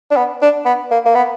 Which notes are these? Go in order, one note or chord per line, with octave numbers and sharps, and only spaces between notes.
D4
B3
D4
B3
A#3
A#3
B3